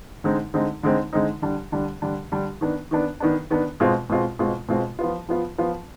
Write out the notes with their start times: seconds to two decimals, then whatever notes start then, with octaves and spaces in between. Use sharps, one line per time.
0.24 D3 G#3 C4 D#4
0.54 D3 G#3 C4 D#4
0.83 D3 G#3 C4 D#4
1.13 D3 G#3 C4 D#4
1.42 D3 G3 D4
1.72 D3 G3 D4
2.02 D3 G3 D4
2.32 D3 G3 D4
2.61 D#3 B3 D4
2.91 D#3 B3 D4
3.20 D#3 B3 D4
3.50 D#3 B3 D4
3.80 B2 G#3 C4 F4
4.10 B2 G#3 C4 F4
4.39 B2 G#3 C4 F4
4.69 B2 G#3 C4 F4
4.99 F3 B3 F4
5.29 F3 B3 F4
5.58 F3 B3 F4